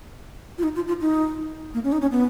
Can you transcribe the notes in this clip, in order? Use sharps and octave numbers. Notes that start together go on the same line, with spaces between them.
F4
D#4
F4
F4
D#4
A#3
C#4
D#4
C#4
B3